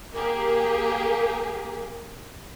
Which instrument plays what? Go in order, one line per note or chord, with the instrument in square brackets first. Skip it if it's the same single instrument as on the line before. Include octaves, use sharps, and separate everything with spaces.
[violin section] A#3 G4 G#4